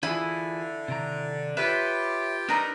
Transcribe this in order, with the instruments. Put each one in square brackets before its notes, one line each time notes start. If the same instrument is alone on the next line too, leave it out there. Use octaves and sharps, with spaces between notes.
[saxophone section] D3 [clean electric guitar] E3 F4 G#4 [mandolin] E4
[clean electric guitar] C3 D#3 A#5
[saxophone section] F4 G4 [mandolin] B4 [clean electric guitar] C#5 E5
[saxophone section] G3 A#4 B4 [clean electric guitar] D4 [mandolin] D#4 A#5